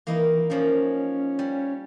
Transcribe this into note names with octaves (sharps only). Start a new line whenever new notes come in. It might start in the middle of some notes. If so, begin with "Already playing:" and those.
E3 A#3 D#4 E4
F3 A#3 C#4 D#4
G3